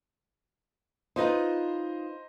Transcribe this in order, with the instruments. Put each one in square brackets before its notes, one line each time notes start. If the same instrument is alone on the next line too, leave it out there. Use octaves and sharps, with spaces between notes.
[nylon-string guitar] D#4 F4 B4 [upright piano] C5 D#5 A#5